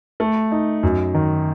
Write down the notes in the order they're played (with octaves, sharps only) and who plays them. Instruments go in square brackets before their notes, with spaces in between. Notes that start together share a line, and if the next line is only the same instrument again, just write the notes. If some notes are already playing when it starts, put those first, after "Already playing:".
[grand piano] A3
D#4
F#2
D#3